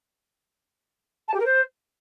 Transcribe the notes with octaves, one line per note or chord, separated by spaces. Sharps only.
A5
G4
A#4
C5